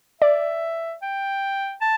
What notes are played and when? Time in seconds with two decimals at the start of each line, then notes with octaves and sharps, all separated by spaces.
0.22 D5 E5
1.02 G5
1.81 A5